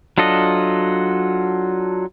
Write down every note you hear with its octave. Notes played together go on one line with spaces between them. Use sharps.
F#3 D4 F4 A4 D#5